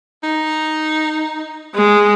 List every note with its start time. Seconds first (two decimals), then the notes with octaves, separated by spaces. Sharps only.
0.23 D#4
1.75 G#3